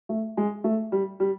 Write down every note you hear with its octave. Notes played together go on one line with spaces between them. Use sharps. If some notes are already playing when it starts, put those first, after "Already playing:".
A3
G#3
A3
G3
G3